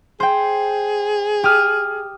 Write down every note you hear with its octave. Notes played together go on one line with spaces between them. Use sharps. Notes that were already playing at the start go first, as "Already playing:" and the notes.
G#4 C5 G5
G4 D#6 F6